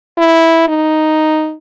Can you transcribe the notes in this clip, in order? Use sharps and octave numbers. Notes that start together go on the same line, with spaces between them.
E4
D#4